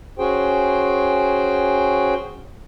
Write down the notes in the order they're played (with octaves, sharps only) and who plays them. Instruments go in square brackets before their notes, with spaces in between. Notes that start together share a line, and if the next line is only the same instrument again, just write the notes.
[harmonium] C#4 F#4 G#4 C5 G5